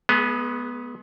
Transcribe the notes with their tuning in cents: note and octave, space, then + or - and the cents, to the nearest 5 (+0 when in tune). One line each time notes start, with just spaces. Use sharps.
G#3 +35 B3 -15 G#4 +0